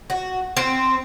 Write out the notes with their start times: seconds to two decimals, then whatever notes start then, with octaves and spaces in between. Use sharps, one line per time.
0.10 F#4
0.57 C4